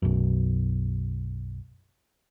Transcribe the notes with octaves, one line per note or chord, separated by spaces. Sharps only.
B1 F#2